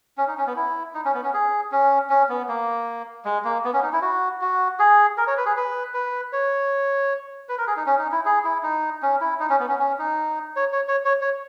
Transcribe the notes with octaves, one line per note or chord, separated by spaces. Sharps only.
C#4
D#4
C#4
B3
E4
D#4
C#4
B3
C#4
G#4
C#4
C#4
B3
A#3
G#3
A#3
B3
C#4
D#4
E4
F#4
F#4
G#4
A#4
C#5
B4
G#4
B4
B4
C#5
B4
A#4
G#4
D#4
C#4
D#4
E4
G#4
E4
D#4
C#4
E4
D#4
C#4
B3
C#4
C#4
D#4
C#5
C#5
C#5
C#5
C#5